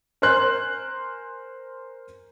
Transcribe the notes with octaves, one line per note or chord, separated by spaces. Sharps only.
A#4 C5 G#5 C6 F#6 G6